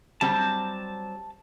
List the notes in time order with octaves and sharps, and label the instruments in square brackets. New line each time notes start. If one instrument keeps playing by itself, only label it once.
[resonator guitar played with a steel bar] F#3 G3 C4 [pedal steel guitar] A5